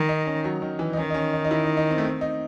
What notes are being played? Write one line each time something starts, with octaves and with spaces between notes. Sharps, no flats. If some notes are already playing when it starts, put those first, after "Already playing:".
Already playing: D#3
D#4
C#4
F#3
D#3
E3
D#4
D#3 C#4
D#4
C#4
D#4
D#4
E4
D#4
D#4
C4
A3
C4
D#4